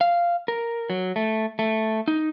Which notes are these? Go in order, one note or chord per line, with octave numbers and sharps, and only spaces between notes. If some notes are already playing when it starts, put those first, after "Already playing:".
F5
A#4
F#3
A3
A3
D#4